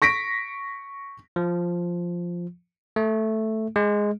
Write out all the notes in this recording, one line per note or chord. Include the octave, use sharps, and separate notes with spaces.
C#6 A#6 B6 D7
F3
A3
G#3